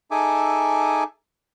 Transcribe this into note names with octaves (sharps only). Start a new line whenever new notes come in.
D#4 G#4 A4 E5 G#5 D6